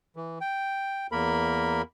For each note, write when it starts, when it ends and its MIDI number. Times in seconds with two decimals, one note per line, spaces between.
0.16 0.39 52
0.41 1.07 79
1.12 1.82 40
1.12 1.82 58
1.12 1.82 70
1.12 1.82 83